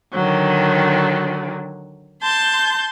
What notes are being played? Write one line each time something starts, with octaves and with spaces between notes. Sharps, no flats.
D3 D#3 F#3
A5 C6 G6